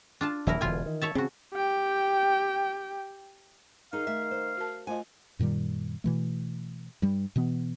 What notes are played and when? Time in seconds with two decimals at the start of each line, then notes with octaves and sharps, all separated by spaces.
0.21 D4 F4 A5
0.47 D#1 E3 F#3 E4 A#4
0.61 E1 B2 D3 E3 F4 G#5
0.86 D#3
1.02 C#5 E5 A5
1.15 C#3 C4 F#4
1.53 G4 G5
3.93 D#3 D#4 G#4 F5
4.07 A3 E5
4.31 C5
4.57 F#4 A#4 A5
4.87 F3 A3 F4 D#5 G#5
5.39 F#2 A#2 D#3 G3
6.04 B2 E3 A3
7.02 G2 G3
7.36 B2 E3 B3